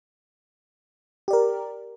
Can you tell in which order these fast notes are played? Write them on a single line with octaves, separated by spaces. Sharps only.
G4 D5 A#4